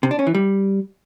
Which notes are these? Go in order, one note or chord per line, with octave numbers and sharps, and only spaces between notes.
C3
D4
C#4
E3
G3